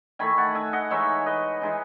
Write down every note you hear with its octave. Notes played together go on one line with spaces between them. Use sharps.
D#3 A3 E4 G#5 B5
F#5 A5
E5 G#5
D#5 F#5
E3 G#3 D#4 C#5 E5
B4 D#5
E3 G#3 D#4